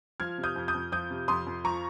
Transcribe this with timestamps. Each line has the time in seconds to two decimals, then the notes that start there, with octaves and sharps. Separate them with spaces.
0.20 F3 F6 G#6
0.38 C3
0.44 D#6 G6
0.56 F2
0.68 D#6 G6
0.74 F2
0.92 F3 D#6 G6
1.10 C3
1.28 F2 C6 D#6
1.47 F2
1.64 F3 A#5 C#6